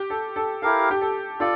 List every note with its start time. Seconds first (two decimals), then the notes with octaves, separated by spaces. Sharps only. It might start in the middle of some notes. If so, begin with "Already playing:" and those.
Already playing: G4
0.10 A4
0.36 A4
0.62 E4 G4 A4 A#4 F5
0.91 G4
1.01 A4
1.40 F4 A4 D5